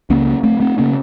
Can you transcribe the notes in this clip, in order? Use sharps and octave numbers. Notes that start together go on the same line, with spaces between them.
C#2 C#3 A#3 C#4
A3 C4
A3 C4
C#3 A#3 C#4